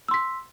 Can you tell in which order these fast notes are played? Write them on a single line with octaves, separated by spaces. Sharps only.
E6 C6 B6